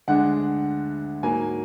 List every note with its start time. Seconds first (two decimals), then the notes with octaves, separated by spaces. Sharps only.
0.08 D2 D3 G#3 D4 F#5
1.23 G#2 F#3 A#3 G#5